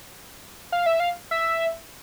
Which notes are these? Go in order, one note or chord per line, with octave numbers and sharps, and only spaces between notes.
F5
E5
F5
E5